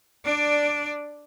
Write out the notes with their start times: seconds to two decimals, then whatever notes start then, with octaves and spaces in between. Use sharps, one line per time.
0.25 D4 D5